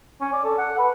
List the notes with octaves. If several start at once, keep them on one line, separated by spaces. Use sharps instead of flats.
C#4
D5
A4
F#5
B4